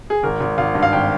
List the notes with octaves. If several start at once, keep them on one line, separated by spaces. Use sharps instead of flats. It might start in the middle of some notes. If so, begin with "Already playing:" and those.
G#4
G#1 A#4
G#1
G#1 F5
G2
F5
G#1 G5